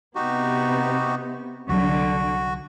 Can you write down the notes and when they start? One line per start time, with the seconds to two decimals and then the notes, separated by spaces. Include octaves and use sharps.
0.15 C3 B3 D#4 F#4 G4
1.69 C2 D3 F#3 F#4